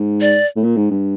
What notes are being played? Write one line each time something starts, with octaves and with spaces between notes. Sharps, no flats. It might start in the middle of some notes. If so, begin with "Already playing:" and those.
Already playing: G#2
D5
A2
A#2
G#2
G2